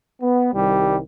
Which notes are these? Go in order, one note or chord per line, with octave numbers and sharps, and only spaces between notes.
B3
C2 D#3 G3